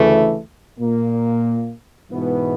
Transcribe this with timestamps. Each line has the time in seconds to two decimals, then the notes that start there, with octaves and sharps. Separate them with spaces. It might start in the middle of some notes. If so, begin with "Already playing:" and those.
Already playing: D2 C#3 E3 A3
0.79 A#2 A#3
2.11 G#2 B2 E3 B3